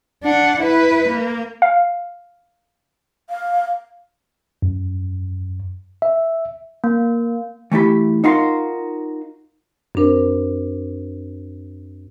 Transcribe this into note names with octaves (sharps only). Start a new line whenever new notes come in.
D4 F#5
E4 B4
A#3
F5
F5
F#2
E5
A#3
E3 A3 E4 G4 B5
D#4 F4 F#4 A#4 F5 C6
F#2 C4 D4 A#4 C5